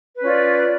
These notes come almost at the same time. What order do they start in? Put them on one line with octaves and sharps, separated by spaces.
B4 C#4 F4 D5